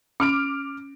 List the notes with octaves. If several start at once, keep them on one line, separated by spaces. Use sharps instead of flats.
C#4 D6 F6 D7